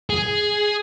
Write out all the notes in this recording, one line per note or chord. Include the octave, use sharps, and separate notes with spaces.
G#4